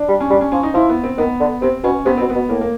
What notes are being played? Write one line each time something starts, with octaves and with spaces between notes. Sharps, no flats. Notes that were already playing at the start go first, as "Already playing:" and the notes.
Already playing: D4
G3
C#4
G3 D4
C#4
F3 C#4
D#4
F3 E4
B3
C4
D#3 B3
D3
C3 C4
B2 C#4
C3 B3
B2 C4
B3
B2
A2 A#3
A#3